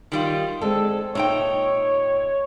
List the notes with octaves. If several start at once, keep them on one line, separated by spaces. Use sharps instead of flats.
D#3 G3 F4
D3 G#3 C4 A4
A#2 D#4 C#5 E5 G5